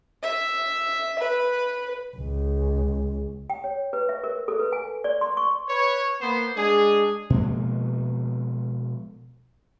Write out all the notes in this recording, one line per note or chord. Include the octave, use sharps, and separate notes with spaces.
E5
B4
C#2
G5
C#5
B4
E5
A#4
A4
B4
G#5
D5
C6
C#6
B4 C#5
A#3 B3 C5
G#3 D4 G#4
B2 F3 G#3 A#3